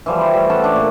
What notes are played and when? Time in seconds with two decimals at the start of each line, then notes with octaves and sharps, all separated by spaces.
0.06 E3 F3 G3
0.21 E4 C5
0.34 G3 A3
0.50 C#4 A4 F#5 A5
0.64 D4
0.76 A#2